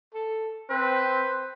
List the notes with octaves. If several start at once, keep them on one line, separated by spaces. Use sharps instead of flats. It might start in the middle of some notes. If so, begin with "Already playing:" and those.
A4
C4 B4 C5